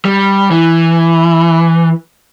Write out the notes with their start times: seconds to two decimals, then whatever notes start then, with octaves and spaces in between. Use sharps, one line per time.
0.05 G3
0.51 E3